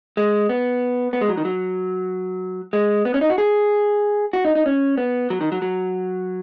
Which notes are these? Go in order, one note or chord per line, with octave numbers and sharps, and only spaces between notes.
G#3
B3
B3
G#3
F#3
D#3
F#3
G#3
B3
C#4
D#4
F#4
G#4
F#4
D#4
D#4
C#4
B3
F#3
D#3
F#3
F#3